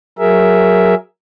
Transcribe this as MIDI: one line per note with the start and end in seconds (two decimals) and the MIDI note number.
0.18 0.94 54
0.18 0.94 68
0.18 0.94 70
0.18 0.94 76